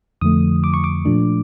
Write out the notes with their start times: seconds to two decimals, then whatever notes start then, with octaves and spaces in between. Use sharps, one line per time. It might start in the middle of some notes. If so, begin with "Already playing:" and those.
0.21 F2 D3 F3 A3 D#6
0.64 D6
0.74 C#6
0.84 D6
1.05 A#2 F3 A3 D4